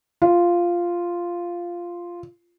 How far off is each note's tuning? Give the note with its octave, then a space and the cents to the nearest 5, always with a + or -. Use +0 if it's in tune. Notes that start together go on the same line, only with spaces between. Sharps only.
F4 -5